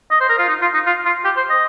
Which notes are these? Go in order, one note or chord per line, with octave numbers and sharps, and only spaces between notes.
D#5
C5
A#4
F4
D#4
F4
D#4
F4
F4
G4
C5
D#5